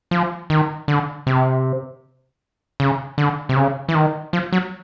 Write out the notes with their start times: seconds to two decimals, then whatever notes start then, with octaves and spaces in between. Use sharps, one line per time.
0.11 F3
0.50 D#3
0.88 D3
1.27 C3
2.80 C#3
3.18 D3
3.49 C3
3.56 C#3
3.89 E3
3.95 D#3
4.33 F3
4.53 F#3